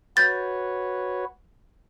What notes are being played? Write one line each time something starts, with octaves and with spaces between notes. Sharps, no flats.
F#4 B4 C#5 G6 A6